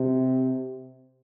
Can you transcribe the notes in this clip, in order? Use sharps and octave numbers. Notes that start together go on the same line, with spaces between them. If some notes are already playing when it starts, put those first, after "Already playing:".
Already playing: C3